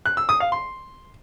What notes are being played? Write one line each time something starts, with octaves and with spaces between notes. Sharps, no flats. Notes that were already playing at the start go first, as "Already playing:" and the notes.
F#6
E6
D#6
F5
C6